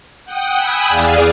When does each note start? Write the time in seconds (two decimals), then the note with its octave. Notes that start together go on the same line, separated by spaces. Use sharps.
0.25 F#5 G5 D#6
0.56 G5 G#5 B5 D#6 E6 F#6
0.89 E2 G#4 D5 F5 G#5